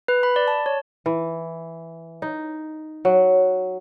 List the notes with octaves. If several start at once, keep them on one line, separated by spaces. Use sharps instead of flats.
B4
B5
D5
A5
C#5
E3
D#4
F#3